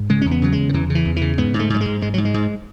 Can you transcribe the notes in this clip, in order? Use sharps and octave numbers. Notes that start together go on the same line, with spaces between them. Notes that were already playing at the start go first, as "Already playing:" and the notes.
Already playing: G#2
C#3 G#3
E2 C#4
B3
C#3 F#3
E2 G#3
D#3
E2 E3
C#3
E3
E2
E3
C#3
G#2 B3
G#2
A3
G#2 F#3
G#3
G#2
G#2 G#3
G#2 F#3
G#3
G#2